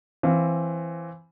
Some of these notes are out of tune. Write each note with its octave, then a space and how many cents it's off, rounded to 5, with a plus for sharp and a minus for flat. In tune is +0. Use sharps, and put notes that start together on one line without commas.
E3 +15 C4 +15 F5 +0